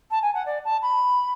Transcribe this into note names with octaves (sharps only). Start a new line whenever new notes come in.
A5
G#5
F#5
D5
A5
B5